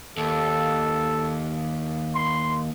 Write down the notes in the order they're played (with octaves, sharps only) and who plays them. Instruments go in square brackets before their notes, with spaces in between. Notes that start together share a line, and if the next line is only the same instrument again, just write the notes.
[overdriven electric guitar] D#2 [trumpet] A4
[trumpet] C6